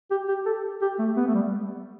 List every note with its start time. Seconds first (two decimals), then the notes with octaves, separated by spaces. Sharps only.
0.11 G4
0.28 G4
0.46 A4
0.82 G4
0.99 A3
1.17 B3
1.27 A3
1.35 G3